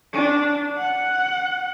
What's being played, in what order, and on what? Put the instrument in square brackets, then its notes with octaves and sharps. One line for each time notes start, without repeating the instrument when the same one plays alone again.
[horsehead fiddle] D4
F#5